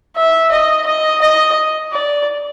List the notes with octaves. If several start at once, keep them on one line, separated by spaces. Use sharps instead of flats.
E5
D#5
D#5
D#5
D5